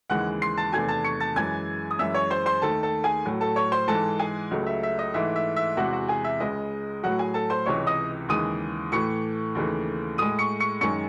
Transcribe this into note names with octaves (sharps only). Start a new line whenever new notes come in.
D#2 C#3 E3 G#3 F#5 F#6
C6 C7
A5 A6
E2 C3 D#3 A3 G#5 G#6
A5 A6
C#6 C#7
A5 A6
F#2 E3 G#3 G#5 G#6
D#6
F#2 E3 G#3 E5 E6
C#5 C#6
C5 C6
C5 C6
D#2 D#3 A3 A4 A5
A4 A5
G#4 G#5
A2 F#3 A3
A4 A5
C#5 C#6
C5 C6
G#2 E3 G#3 A4 A5
G#4 G#5
C#2 C#3 F#3 A3
E5
E5
D#5
G#2 E3 A3 E5
E5
E5
E2 C3 E3 G#3 F#4 F#5
F#4 F#5
G#4 G#5
E5
C#2 C#3 G#3 D#5
A2 F#3 A3 F#4 F#5
G#4 G#5
A4 A5
C5 C6
C#2 C3 E3 C#5 C#6
D#5 D#6
D#2 C#3 E3 G#3 D#6 D#7
A2 E3 A3 C#6 C#7
D#2 C#3 E3 A3
A2 G#3 D#6 D#7
C#6 C#7
C#6 C#7
F#2 D#3 G#3 C#6 C#7